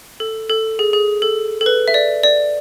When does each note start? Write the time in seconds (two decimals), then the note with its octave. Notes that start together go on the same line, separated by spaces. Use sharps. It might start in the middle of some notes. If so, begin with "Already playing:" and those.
0.20 A4
0.49 A4
0.79 G#4
0.93 G#4
1.22 A4
1.61 A4
1.66 B4
1.88 E5
1.94 D5
2.23 D5